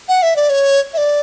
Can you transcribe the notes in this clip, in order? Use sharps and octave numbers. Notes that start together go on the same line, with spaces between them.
F#5
E5
D5
C#5
E5
D5